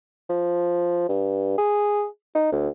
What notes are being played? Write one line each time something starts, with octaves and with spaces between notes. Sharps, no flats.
F3
G2
G#4
D#4
D2